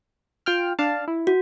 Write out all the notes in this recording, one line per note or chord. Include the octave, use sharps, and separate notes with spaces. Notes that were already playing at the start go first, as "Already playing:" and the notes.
F4 G5 F6
D4 F5 A5
E4
F#4